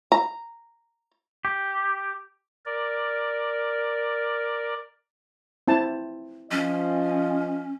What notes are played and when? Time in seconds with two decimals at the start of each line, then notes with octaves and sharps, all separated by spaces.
0.12 A#5
1.45 G4
2.66 A#4 D5
5.68 C4 E4 A5
6.51 F3 C#4 D#5